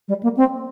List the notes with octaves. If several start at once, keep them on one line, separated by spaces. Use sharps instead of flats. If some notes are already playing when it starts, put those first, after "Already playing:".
G3
A#3
C4